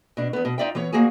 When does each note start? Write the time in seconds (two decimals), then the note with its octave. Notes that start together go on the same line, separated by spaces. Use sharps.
0.17 B2 D4
0.33 E2 B3
0.45 B2
0.58 D#4 F4 D5 E5 G5
0.75 E3 B3 C#5
0.92 D2 A#3 F#4 G#4 G#5